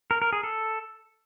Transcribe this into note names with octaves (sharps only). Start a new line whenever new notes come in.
A#4
A#4
G#4
A4